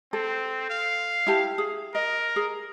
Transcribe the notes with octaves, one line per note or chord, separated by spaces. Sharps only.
C4 A4
F5
E4 G4 A5
G#4
A#4 D#5
G#4